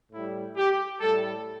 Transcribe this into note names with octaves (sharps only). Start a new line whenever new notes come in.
A2 G3 E4
G4
A2 G3 A4